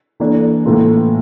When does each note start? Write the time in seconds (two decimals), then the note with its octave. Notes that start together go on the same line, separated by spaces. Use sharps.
0.20 E3 A#3 D4 A4
0.64 A2 E3 A#3 F4 A4